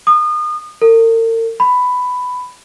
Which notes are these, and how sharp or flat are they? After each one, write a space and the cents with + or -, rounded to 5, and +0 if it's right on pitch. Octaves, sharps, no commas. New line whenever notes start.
D#6 -35
A#4 -45
B5 +10